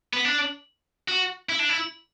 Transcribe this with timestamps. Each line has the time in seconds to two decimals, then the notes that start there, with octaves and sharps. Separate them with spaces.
0.13 B3
0.25 D4
1.08 F#4
1.49 E4
1.59 D4
1.69 E4